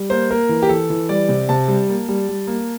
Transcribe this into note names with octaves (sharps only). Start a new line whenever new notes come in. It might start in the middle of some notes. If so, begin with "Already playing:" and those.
Already playing: G3
A#3 C5
A#3 A#4
E3
G4
E3 A4
E3
G3 D5
C3
C3 A5
G3
A#3
G3
G3
A#3